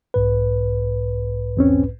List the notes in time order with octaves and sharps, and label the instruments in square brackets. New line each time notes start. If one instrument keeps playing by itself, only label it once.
[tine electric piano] B1 G#2 B4
[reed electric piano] E2 C4 C#4